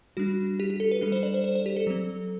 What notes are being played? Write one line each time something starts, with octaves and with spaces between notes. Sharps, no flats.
G3 D4 F#4
G4
G4
A4
B4
G3 D4 A4
C5
D5
C5
C5
C5
G4
A4
F#3 C4